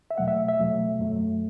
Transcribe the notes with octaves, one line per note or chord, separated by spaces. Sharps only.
E5
E2 B2 F#3 A3 F#5
E5
E5
E2 B2 F#3 A3
F#2 F#3 A3